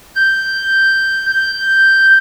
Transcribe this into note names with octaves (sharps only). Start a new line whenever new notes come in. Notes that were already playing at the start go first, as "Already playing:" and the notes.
G6
G6